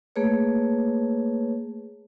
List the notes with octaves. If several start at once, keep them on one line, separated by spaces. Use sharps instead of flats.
A3 A#3 G#4 B4 C#5